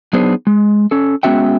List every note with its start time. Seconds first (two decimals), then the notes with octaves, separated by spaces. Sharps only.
0.13 F#3 B3 D4 D#4 G#4 C5
0.47 G#3
0.91 C#4 A4
1.23 G#3 B3 C#4 F#4 E5 G5